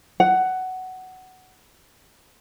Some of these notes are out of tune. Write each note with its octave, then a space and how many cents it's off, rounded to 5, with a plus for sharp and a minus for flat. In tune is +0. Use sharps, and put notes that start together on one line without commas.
F#5 +10